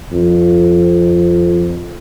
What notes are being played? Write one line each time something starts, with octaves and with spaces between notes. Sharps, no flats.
F2